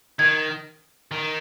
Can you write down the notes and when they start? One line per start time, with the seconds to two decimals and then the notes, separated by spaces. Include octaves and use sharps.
0.19 D#3 G#6
1.12 D#3